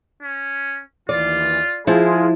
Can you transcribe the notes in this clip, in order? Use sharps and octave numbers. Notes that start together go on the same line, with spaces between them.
C#4
D#2 E3 F4 D5
F3 G#3 E4 F4 G#4